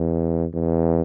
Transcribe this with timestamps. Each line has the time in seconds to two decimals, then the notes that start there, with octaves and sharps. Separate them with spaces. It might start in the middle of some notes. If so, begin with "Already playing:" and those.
Already playing: E2
0.54 E2